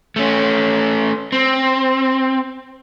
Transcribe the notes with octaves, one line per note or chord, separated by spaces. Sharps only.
A3 C#4
C4